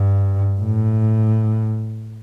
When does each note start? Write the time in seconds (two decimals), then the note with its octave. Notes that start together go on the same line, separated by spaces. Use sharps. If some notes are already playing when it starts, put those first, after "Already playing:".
Already playing: G2
0.61 A2